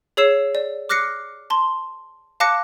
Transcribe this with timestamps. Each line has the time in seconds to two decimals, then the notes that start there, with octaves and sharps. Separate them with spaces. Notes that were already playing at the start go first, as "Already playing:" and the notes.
0.17 G#4 C#5 E6 C7 E7
0.55 D5
0.89 D6 F6 F#6 A#6 C7 C#7
1.50 A5 C6
2.40 F5 A5 D6 F#6 A#6 C#7